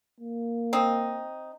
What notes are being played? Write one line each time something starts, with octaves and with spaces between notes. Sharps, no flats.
A#3
C4 D#4